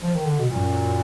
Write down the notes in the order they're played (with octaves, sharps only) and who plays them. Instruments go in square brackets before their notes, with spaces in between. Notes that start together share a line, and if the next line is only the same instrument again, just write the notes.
[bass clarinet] F3
D#3
D3
B2
[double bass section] F#2 [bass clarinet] A#2